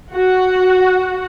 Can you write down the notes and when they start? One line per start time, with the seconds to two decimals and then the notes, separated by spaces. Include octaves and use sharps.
0.14 F#4